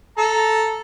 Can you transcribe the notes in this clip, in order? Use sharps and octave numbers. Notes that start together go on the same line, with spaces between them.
A4 A#5